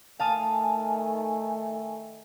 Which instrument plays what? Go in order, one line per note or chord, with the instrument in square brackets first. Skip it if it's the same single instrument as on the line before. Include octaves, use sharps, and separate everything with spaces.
[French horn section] D#3 A3 [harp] F5 A5 D#6 [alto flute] G#5